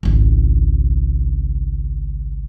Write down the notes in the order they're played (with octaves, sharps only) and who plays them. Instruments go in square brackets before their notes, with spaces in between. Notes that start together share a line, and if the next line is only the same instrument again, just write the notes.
[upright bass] G#1 C#2